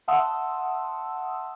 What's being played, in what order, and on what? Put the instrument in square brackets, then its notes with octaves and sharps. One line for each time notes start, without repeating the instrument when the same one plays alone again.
[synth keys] E5 F#5 A5 C6 D#6 E6